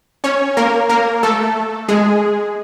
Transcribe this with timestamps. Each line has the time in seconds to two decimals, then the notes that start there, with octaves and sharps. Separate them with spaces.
0.24 C#4 C#5
0.57 A#3 A#4
0.89 A#3 A#4
1.23 A3 A4
1.88 G#3 G#4